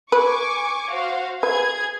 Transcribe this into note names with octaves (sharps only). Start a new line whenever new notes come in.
B4 G#5 C#6 D6
F#4 C5 F5
G#4 B4 G#6